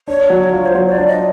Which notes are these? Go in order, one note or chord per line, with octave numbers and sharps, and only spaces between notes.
D4 C#5
F#3
F4
C5
F#3 C#5
D5
D4
D#5